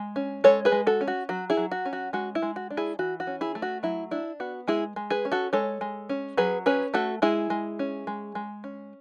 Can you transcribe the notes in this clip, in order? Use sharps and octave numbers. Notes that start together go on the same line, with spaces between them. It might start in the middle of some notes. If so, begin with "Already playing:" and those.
Already playing: G#3
C#4
G#3 A4 C#5
G#4 B4
G#3
F#4 A4
C#4
F#4
F#3 F#4
E4 G#4
F#3
F#4
C#4
F#4
G#3 F#4
E4
G#3
F#4
D4
E4 G#4
E3 F#4
F#4
C#4
E4 G#4
A3
F#4
F#3 E4
D4 E4
B3 F#4
G#3 E4 G#4
G#3
G#4 B4
C#4
F#4 A4
G#3 A4 C#5
G#3
C#4
F#3 G#4 B4
C#4 G#4 B4
A3 F#4 A4
G#3 E4 G#4
G#3
C#4
G#3
G#3
C#4